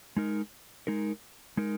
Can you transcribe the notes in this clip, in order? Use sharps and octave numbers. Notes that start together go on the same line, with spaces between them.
G#3 D#4 A#4
G#3 D#4 A#4
G#3 D#4 A#4